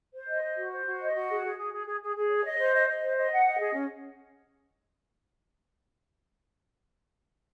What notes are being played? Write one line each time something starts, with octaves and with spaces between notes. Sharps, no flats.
C5
D#5
C5
F#4
C5
F#4
D#5
F#4
G#4
G#4
G#4
G#4
G#4
G#4
G#4
C#5
D#5
C5
D#5
D#5
C5
D#5
F#5
D#5
G#4
C#4